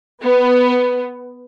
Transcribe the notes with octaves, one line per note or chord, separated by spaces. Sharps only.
B3